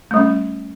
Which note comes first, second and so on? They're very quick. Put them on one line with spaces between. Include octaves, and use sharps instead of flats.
A3 G3 C#4